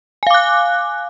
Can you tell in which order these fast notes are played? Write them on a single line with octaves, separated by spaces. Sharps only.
G#5 F5 D6 F#6